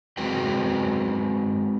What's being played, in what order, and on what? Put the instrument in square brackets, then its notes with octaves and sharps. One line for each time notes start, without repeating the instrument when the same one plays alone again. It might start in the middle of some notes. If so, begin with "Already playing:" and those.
[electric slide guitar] G#3 C4 F#4 B4 G5